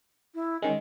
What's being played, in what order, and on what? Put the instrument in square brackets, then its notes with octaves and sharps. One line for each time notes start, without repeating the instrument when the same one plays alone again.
[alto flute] E4
[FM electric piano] D#3 G#3 [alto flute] C#4